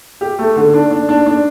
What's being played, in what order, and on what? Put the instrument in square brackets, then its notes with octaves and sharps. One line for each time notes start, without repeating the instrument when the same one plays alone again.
[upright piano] G4
A3
D3
D4
D4
D4
D4